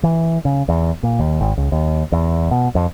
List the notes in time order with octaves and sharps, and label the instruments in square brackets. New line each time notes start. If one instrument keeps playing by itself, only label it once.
[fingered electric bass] E3
C#3
E2
A#2
D#2
G#1
C#2
D#2
E2
B2
F2